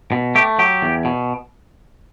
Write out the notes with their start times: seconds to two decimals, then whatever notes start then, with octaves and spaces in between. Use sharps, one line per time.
0.12 B2
0.35 A3 G4
0.59 F#3 G4
0.82 E2
1.05 B2